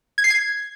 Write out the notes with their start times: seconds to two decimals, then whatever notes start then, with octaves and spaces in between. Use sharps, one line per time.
0.18 G#6
0.24 C7
0.30 G#6